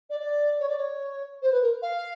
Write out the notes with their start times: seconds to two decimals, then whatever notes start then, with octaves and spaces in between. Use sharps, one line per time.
0.09 D5
0.20 D5
0.60 C#5
0.68 D5
0.78 C#5
1.42 C5
1.51 B4
1.61 A#4
1.82 F5